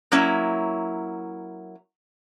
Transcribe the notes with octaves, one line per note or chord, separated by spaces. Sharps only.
F#3 A#3 C#4 E4